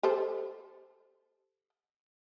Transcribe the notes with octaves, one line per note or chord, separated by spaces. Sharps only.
G4 A4 C5